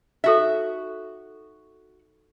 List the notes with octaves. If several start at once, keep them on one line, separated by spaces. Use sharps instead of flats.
D#4 F#4 A4 E5